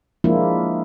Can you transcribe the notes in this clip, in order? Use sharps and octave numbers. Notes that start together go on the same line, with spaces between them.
F3 G#3 A#3 D4 E4 F4